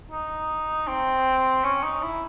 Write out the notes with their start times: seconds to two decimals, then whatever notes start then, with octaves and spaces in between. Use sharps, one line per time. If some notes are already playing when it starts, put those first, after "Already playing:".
0.11 D#4
0.88 C4
1.64 C#4
1.83 D#4
2.02 E4